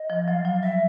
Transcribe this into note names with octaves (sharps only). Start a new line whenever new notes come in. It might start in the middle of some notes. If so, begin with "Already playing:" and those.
Already playing: D#5
F3
F#3 F5
F#3
G3 E5